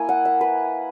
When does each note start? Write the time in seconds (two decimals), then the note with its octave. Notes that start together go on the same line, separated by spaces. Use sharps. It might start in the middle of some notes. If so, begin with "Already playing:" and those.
Already playing: A#3 E4 G#5
0.09 F#5
0.25 E5
0.41 B4